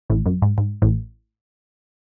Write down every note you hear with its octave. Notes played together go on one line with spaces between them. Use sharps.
A1 A2
F#2
G#2
G#2
A1 A2